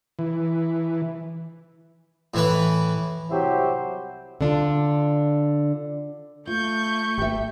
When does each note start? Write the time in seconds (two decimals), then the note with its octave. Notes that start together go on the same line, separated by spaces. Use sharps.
0.19 E3
2.34 A2 E3 B4
3.30 C2 F#3 E4 G4 C5
4.41 D3 D4 F4
6.47 A3 F4 C#6 G6
7.18 G#1 G4 E5